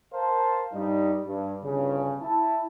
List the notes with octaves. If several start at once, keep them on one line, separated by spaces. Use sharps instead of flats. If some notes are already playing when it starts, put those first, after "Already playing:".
A#4 C5 F5 A5
G2 G3 D#4
G2
G1 G2 C#3
E4 A5